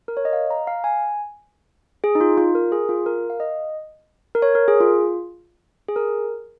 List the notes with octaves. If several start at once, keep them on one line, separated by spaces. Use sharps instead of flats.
A#4
C#5
D#5
F5
A#5
F5
G#5
G#4
D#4
F4
F4
A#4
G#4
F4
A#4
F5
D#5
A#4
C#5
A#4
G#4
F4
G#4
A#4